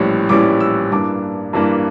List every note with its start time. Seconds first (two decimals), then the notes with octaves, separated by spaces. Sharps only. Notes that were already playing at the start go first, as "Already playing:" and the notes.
Already playing: A#1 A2 E3 G3 C#4
0.29 A#1 A2 E3 G3 C#4 D6
0.60 E6
0.92 G2 E3 A#3 D4 D6
1.53 G2 E3 A#3 D4